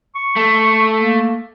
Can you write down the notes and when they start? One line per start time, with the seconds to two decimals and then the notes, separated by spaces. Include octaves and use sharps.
0.15 C#6
0.36 A3
0.99 A#3